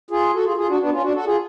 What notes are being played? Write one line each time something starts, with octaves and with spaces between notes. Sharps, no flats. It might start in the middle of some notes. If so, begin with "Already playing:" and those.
F4 G#4
F#4 A4
F4 G#4
F4 G#4
D4 F#4
B3 D4
C#4 F4
D4 F#4
F#4 A4
F4 G#4